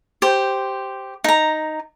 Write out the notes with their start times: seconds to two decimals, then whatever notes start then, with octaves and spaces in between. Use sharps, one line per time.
0.22 G4 C5
1.24 D#4 A#5